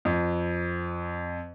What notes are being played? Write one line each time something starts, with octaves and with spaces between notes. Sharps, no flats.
F2